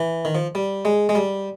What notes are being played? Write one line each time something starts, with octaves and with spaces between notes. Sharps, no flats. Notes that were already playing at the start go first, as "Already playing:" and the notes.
Already playing: E3
D#3
F3
G3
G#3
G#3
G3